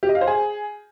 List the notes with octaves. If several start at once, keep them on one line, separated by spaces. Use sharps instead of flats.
G4
D#5
F5
C5
G#4